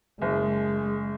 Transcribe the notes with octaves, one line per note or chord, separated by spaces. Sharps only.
F#1 G#3